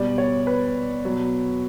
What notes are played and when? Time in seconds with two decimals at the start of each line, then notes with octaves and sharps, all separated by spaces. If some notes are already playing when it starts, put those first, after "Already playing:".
Already playing: B2 G3 D5
0.18 C#5
0.47 B4
1.05 B2 F#3